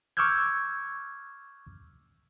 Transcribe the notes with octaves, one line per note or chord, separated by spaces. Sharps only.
C#6 D6 E6 F6 G6 G#6